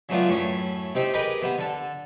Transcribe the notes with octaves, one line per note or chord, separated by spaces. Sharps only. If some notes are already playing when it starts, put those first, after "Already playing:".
C#3 F#3 A3 B3 D4 F4
F#2 A2 A3 C#4
C3 C4 D#4 G4
G4 G#4 A#4 B4 D#5
C3 B3
D3 A4